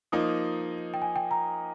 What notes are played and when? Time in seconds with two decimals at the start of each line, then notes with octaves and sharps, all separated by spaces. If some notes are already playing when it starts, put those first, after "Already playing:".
0.12 F3 A#3 D#4 D#6
0.94 G5
1.02 G#5
1.16 G5
1.31 A#5